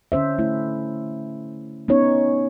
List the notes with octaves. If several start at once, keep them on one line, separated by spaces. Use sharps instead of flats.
D3 C#4 C5 E5
A3 E4
B3 C#4 D#4 C#5